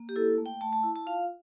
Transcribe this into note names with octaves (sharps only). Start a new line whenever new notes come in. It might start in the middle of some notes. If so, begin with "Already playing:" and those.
Already playing: A#3
G4
E4 A4
A3
G5
A3 A5
A5
E4
A5
F4 F5